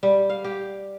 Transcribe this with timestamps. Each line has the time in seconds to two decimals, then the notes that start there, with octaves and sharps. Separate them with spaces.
0.03 G3
0.30 F5
0.44 G4